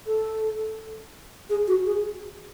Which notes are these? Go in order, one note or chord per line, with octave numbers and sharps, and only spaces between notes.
A4
G#4
F#4
G#4